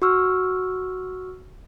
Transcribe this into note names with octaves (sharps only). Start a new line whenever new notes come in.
F#4 C#6 E6 F6